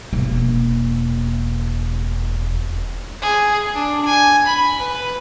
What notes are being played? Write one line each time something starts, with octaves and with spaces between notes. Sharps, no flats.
E1 A#3
G#4
D4
G#5
B5
B4